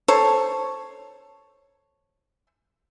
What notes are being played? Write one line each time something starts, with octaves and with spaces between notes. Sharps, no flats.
A4 C5 C#5